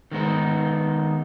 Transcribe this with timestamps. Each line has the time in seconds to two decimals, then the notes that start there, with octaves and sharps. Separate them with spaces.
0.11 D#3 G#3 B3 D#4